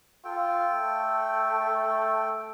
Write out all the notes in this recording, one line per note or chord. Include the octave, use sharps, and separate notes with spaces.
F4 A4 G5
A3